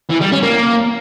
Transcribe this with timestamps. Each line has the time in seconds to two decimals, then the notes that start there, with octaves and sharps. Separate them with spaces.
0.11 E3
0.21 G3
0.32 C#4
0.43 A#3